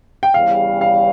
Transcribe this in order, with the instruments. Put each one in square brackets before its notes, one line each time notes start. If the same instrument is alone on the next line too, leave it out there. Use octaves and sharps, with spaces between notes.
[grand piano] G5
[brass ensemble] E2 C#3 G3 [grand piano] F5
[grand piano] F5